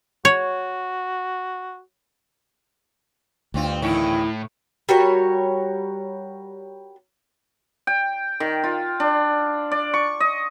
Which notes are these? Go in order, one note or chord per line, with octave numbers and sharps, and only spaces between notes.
F#4 C#5
D2 G2 C4 F4
E2 A2 D#3 C#4 E4
G3 F#4 A#4 C#5
G5
D#3
F4
D4
D5
C#6
D#5